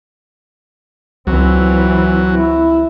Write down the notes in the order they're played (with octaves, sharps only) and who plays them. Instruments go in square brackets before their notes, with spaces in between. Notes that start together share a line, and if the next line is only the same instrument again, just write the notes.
[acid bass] C#2 [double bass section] E3 C4 [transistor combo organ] F#3
[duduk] E4